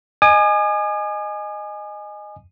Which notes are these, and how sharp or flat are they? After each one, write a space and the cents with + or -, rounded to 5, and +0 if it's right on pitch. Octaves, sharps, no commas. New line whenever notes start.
D#5 -15 G#5 +0 D#6 -45